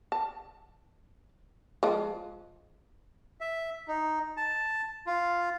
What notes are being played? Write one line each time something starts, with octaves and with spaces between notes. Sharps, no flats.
A5
F3 G#3
E5
D#4
A5
F4